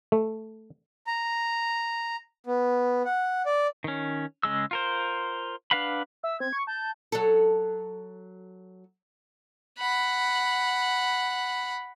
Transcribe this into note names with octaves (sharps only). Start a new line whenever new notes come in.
A3
A#5
B3
F#5
D5
D#3 C#4
C#3 G#3 E6
F4 A#4 C5
D4 B4 F5 F#5 B5
E5 E6
C4 G#6
C#6
A5 G6
F#3 A4
F#5 B5